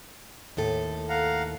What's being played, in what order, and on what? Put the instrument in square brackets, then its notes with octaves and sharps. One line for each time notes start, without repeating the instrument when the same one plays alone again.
[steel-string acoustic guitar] D#2 A2 A4
[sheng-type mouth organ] F5 F#5 A#5